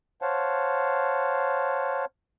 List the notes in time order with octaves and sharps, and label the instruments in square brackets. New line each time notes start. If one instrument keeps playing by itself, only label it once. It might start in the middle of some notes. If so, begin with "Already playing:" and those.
[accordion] C5 C#5 F5 F#5 A5